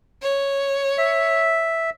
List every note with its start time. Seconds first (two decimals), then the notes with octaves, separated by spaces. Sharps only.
0.22 C#5
0.98 E5